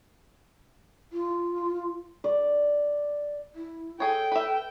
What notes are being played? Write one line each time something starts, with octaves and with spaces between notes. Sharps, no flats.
F4
D5
E4
G#4 A4 C#5 G5
B4 E5